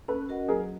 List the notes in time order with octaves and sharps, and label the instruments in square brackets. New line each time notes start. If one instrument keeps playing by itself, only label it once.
[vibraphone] C#4 [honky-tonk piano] A4 B4
[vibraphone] F#4 A#4 D#5 F#5
[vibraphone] F#3 [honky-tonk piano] G#4 A#4